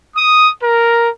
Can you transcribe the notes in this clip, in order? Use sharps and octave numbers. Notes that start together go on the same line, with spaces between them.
D#6
A#4